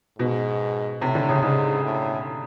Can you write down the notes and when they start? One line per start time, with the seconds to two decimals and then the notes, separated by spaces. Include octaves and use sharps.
0.19 G#2 B2
1.01 A2 C3
1.15 D3
1.29 C#3
1.43 G#2 C#3
1.84 A2